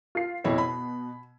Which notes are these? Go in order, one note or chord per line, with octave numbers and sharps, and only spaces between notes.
F4 C7
F2 B2 E4 C#5
B5